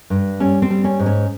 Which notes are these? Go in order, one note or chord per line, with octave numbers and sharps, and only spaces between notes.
G2
G3 C#4
C4
G3
C#4
G#2
C#4